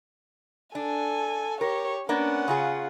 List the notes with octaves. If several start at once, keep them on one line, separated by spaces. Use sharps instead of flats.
D4 A4 G#5
G4 A#4 C#5
A#3 B3 C#4 D4 F#5
C#3 F4 G#4